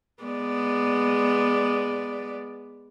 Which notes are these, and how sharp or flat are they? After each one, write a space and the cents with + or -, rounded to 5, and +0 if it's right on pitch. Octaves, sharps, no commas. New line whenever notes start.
G#3 -10 B3 +0 D5 +0